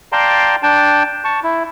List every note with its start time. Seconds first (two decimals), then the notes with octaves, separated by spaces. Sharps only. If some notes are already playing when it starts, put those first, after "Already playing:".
0.12 D5 F5 G5 A5 A#5 C6
0.63 D4 G5 A5
1.24 A5 C#6
1.44 E4